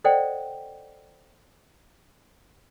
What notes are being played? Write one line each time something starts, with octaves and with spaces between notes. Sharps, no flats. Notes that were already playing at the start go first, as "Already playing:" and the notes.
A4 C5 D5 D#5 F#5 G5